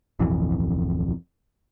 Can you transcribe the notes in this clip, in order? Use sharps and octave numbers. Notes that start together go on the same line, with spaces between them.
D1 B1 F2 E3